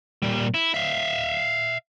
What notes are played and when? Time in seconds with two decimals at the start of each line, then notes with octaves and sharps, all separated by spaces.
0.22 A#2 G3
0.54 E4
0.74 E5 F5